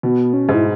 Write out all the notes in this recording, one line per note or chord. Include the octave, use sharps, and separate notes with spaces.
B2 B3
C#4
G#2
E4